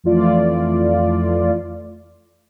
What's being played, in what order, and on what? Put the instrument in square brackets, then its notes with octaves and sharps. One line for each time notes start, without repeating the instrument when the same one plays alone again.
[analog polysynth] F2 E3 A3 F4 D5